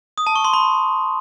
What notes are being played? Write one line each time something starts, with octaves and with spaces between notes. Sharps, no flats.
D#6
A5
C#6
C6
B5